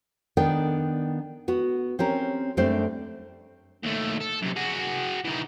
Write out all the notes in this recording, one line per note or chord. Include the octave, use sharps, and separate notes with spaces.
D#3 B3 D4 A#4 D5 G5
B3 F#4
C4 C#4 G4 A#4
F#2 G3 A3 C4 D4 C5
D#2 A3
A4
F#2 C3
F#4 G#4
E3 D#4